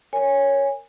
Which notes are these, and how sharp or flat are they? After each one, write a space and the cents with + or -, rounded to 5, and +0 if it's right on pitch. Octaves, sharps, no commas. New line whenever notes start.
A#4 -15 C#5 +0 G#5 -15